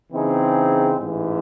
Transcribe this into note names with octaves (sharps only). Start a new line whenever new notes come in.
C#3 E3 C4 D#4 G#4
A1 G#2 E3